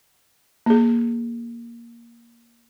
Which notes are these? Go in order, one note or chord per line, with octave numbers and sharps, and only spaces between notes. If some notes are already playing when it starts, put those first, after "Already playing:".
A#3 G#4